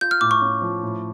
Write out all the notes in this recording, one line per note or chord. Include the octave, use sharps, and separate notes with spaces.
F4 G6
F6
A2 D6
C#6
C#4
F3
A2